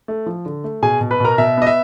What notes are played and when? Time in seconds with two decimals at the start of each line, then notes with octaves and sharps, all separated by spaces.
0.08 A3
0.26 F3
0.46 D3
0.64 A3
0.82 B2 G#4 G#5
1.01 B2
1.11 B4 B5
1.20 B2 A#4 A#5
1.38 B2 E5
1.57 B3 D#5
1.67 E5